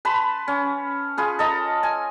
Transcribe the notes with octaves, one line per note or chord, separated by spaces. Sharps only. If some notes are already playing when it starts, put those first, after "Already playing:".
B4 A5 B5 C6
C#4
F4 G#4 B4
A4 D#5 A#5
G#5